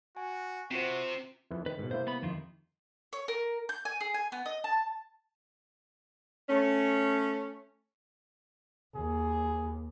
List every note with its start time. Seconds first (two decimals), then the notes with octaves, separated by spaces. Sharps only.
0.17 F#4 G#5
0.71 C3 C4 F4 F#4 C5
1.51 F2 E4 B4
1.66 D#3 B4
1.78 G#2 B2
1.91 C3 A#3 E4 C5
2.07 B3 B5
2.22 F2 D#3 F4
3.13 C#5
3.28 A#4
3.69 G6
3.85 G#5
4.00 G#4
4.14 G#5
4.32 B3
4.46 D#5
4.64 A5
6.50 A3 C#4
8.96 D#2 G#4